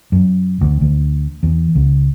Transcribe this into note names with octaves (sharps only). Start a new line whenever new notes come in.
F#2
D2
D2
E2
C#2